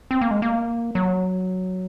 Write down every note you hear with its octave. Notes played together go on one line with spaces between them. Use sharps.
C4
A#3
G#3
A#3
F#3